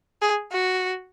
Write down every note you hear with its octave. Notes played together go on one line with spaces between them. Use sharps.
G#4
F#4